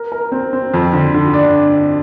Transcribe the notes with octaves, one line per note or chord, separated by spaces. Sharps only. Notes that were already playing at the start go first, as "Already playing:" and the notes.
Already playing: A#4
A#4
C4
C4
F2
D3
D3
D4